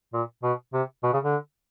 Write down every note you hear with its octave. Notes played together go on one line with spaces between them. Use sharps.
A#2
B2
C3
B2
C#3
D3